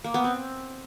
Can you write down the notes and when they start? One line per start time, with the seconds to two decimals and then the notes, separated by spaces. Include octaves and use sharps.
0.04 A#3
0.14 B3
0.24 C4